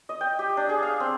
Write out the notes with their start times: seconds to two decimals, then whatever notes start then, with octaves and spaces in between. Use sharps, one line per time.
0.09 D#5
0.21 G5
0.39 G4
0.57 D4
0.69 G#4
0.83 F5
1.00 C4